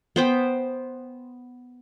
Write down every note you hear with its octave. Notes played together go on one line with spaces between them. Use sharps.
B3 C5 G5